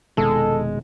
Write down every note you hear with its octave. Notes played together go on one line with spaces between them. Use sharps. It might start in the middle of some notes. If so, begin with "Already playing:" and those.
F1 B2 D#3 G#3 A4